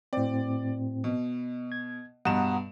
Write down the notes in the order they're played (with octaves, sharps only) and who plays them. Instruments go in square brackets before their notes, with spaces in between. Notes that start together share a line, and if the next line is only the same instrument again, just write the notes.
[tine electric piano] A2 C4 [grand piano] D5
[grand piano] B2
[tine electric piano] G#6
[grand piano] G2 B2 E7 [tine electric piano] F#5 A#5 D#6